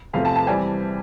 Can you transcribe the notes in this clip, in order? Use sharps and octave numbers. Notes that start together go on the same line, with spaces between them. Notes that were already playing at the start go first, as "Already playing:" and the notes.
E2 C3 F3 A3 F5
A5
A5
E3 G3 C4 G#5